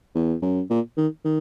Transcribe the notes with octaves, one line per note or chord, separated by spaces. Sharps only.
E2
F#2
A#2
D#3
D#3